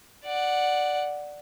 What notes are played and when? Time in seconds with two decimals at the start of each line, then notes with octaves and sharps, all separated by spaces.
0.25 D5 F#5